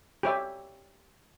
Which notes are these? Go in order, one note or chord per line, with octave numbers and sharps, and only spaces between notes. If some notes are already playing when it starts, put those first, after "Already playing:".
G4 C#5 E5